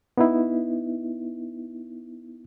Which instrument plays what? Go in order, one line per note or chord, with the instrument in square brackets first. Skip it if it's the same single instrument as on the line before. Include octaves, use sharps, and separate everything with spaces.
[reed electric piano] B3 D#4 E4